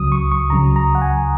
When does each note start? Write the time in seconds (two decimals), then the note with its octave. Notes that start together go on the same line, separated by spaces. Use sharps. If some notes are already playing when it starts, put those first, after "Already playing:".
Already playing: C#2 C#3 F#3 D#6
0.12 C#6
0.32 C#6
0.50 C#2 C#3 F#3 A#5
0.76 A#5
0.95 F#5
1.01 G#5